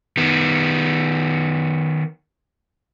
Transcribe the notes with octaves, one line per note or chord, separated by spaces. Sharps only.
D#3 B3